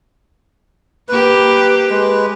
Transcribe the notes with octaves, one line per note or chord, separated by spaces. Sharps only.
A#3 G4 B4
G#3 B4